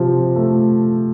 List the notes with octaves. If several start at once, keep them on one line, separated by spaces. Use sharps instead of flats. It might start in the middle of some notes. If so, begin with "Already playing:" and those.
Already playing: C3 F3
A3